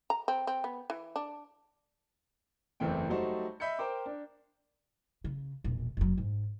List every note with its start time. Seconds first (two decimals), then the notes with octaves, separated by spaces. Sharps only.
0.10 A#5
0.28 C4
0.47 C4
0.64 B3
0.90 E3
1.16 D4
2.80 F#1 E2 E3 A3 C4 G5
3.10 F#3 G3 A3 D#4 F#4 C5
3.60 D#5 E5 B5 G6 C#7
3.79 A#4 C5 G5 D6
4.06 D4
5.24 C#3
5.64 E1 A#1
5.97 F#1 F#3
6.18 G#2